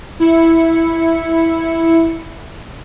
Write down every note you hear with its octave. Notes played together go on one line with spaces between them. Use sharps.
E4 C#7